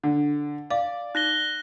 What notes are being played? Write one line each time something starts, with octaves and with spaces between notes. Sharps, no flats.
D3
D5 F5
D#4 F#6 A#6 G7